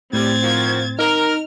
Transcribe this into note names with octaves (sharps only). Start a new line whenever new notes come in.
A2 G3 C4 G#6 A6
D#3 F3 F#4
D#4 A#4 F6